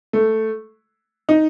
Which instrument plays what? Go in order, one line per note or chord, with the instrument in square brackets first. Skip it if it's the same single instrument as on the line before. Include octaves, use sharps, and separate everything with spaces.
[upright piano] A3
D#4